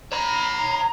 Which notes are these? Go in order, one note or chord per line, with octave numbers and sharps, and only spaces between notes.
C#5 A#5 B5
A#5